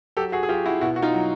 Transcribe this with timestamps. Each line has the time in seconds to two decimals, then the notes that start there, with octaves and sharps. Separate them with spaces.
0.17 F#3 G4 A4
0.32 F#4 G#4
0.43 G#4
0.49 F#3 F4 G4
0.66 E4 F#4
0.81 B2 E4 F#4
0.96 F#4
1.02 D#4 F4
1.14 F#3